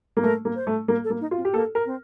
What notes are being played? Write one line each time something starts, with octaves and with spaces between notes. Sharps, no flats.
A#3
A3 A#4
A#3
C5
A3
A#3 A#4
A4
A#3
D#4
F4
C4
G4
A#3 A4
A#4
C4